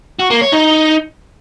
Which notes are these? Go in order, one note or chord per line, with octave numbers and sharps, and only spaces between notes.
F#4
A#3
C#5
D#4